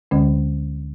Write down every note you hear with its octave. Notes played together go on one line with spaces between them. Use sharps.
D2 D3 G#3 C#4